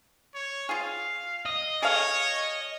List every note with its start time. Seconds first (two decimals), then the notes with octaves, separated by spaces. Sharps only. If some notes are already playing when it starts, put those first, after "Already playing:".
0.34 C#5
0.69 F4 G#4 F5
1.46 D#5
1.82 G#4 A4 C#5 F5